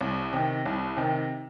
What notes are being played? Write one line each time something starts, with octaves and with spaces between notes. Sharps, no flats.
C2
C3 D#3
C2
C3 D#3